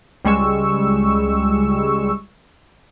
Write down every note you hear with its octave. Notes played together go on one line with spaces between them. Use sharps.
C#2 G3 G#3 C#6 E6